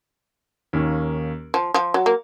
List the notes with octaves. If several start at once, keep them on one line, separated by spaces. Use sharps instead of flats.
D#2 D#3 A#3 C#4
F3
F3
F#3
A#3